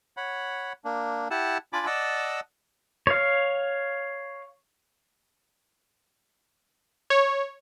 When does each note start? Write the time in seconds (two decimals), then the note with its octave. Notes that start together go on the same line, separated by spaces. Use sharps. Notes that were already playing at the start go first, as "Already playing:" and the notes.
0.17 C#5 F#5 B5
0.85 A#3 D4
1.31 E4 G4 F#5 A5 E6
1.73 D4 F4 D5 G#5 B5 D6
1.86 D5 D#5 F#5 A5 D6 E6
3.07 C#5 F5
7.10 C#5